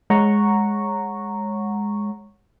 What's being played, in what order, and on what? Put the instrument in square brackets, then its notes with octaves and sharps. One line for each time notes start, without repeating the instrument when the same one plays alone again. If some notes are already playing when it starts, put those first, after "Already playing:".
[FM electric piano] G#3 C#5 F#5 A#5 C#6